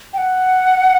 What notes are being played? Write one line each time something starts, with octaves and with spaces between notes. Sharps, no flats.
G5
F#5